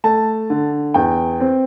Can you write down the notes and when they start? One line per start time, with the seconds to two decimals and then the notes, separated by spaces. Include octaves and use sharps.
0.04 A3 A5
0.50 D3
0.94 E2 G5
1.40 C4